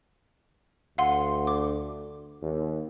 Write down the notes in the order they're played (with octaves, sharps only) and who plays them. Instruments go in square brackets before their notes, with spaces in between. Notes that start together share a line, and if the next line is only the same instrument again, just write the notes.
[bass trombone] D2 [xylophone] F5 F#5 C6
[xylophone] D6
[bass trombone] D#2